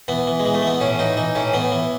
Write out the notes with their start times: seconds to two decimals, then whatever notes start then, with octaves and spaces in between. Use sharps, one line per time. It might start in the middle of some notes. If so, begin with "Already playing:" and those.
0.08 E3 B3
0.27 E3
0.40 G#3
0.46 E3
0.54 A3
0.62 E3 B3
0.81 A2 C#4
0.99 E3 D#4
1.17 E3 D#4
1.35 A2 C#4
1.54 E3 B3
1.72 E3